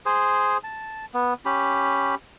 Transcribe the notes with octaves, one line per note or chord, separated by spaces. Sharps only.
G#4 C5
A5
B3
C#4 G4 B5